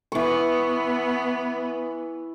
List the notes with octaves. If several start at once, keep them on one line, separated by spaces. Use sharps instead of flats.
E3 B3 C#6